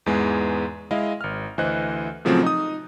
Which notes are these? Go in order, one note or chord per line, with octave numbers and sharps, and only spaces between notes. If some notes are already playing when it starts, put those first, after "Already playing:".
E2 G#2 E3 G#3 B3
G#3 E4 D#5 F5
G#1 F6
D2 E3 C5 D#5 F#6
A#2 C#3 F3 F#3 A3 C4
D#4 D#6